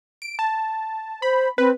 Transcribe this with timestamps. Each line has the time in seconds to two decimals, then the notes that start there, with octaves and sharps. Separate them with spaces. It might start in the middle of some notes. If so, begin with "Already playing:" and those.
0.22 D7
0.39 A5
1.22 C5 B5
1.58 C4 B4